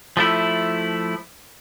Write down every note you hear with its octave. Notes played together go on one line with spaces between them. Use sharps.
F3 A3 E4